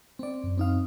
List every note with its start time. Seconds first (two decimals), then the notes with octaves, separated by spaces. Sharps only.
0.19 C4 D5
0.44 F#2
0.58 C4 D#4 F5